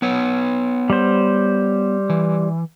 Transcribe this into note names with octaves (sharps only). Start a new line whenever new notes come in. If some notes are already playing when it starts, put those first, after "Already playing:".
B3 B4 C#5
G3 C5
E3